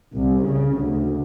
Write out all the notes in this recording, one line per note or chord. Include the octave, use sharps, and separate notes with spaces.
C2
C#3
D2